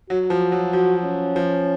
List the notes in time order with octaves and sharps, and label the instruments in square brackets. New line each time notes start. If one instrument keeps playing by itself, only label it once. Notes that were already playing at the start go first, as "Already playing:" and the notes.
[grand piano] F#3 [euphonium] F#4
[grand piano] F3
F#3
[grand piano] F3 [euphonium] F#4
[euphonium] C#4
[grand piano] F3